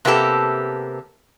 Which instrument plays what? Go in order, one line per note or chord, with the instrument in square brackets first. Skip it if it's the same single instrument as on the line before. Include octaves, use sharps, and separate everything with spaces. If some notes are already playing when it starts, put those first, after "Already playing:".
[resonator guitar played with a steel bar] C3 A#3 B3 G4 A4